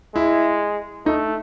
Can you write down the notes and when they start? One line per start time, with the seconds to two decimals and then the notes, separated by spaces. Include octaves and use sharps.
0.15 G#3 E4
1.06 A3 D#4